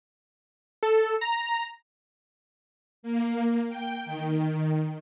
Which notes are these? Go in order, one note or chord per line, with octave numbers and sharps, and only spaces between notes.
A4
A#5
A#3
G5
D#3